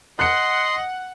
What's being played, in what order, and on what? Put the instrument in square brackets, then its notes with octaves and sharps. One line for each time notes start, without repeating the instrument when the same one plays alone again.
[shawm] D#5 [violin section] F#5 [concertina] C6 [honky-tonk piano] F#6 C#7